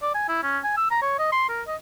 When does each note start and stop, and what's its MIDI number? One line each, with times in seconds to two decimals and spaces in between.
0.02 0.10 74
0.14 0.27 80
0.29 0.40 64
0.43 0.59 61
0.64 0.73 80
0.77 0.87 88
0.91 1.01 82
1.02 1.18 73
1.19 1.28 75
1.32 1.46 84
1.49 1.62 70
1.67 1.75 75